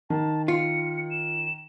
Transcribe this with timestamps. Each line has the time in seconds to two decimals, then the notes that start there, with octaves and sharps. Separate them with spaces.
0.10 D#3 A5
0.48 F4 C#7
1.10 E7